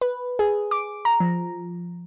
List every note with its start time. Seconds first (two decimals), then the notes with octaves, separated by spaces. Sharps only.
0.01 B4
0.39 G#4
0.71 D6
1.05 A#5
1.20 F3